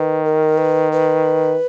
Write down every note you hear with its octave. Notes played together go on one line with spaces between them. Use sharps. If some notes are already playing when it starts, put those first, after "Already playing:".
Already playing: D#3 B4
A#4
B4
B4